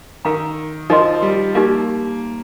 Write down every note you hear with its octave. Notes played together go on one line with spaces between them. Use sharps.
D#3 A#4 F5 A#5
F3 D#4 A#4 D#5 C6
G3
A#3 D#4 G4 A#4 F5